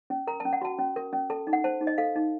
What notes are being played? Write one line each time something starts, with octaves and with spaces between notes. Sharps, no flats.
C#4
A#4 A#5
C#4 A5
F#5
F#4 A5
C#4
A#4
C#4
A4 A5
D#4
F#5
C5 A5
D#4
D#5
A4 F5
D#4